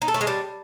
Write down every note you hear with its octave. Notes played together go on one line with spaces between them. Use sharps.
D#4
A4
A3
G#3
G3